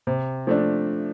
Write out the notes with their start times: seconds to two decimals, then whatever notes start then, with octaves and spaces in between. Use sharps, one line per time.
0.07 C3
0.47 F3 A3 D4